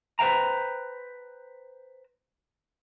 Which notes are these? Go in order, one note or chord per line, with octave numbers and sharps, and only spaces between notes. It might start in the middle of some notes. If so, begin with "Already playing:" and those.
B4 C5 F5 G5 A#5